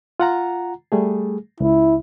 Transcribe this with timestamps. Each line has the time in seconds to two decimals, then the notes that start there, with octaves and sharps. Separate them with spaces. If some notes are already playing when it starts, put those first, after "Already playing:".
0.20 F4 F#5 A#5
0.92 G3 A3 G#4
1.60 C#2 E4